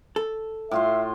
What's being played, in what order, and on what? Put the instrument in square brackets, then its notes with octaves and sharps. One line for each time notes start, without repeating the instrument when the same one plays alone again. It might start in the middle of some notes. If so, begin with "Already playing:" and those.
[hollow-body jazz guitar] A4
[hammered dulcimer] A2 F4 C6 [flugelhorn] E5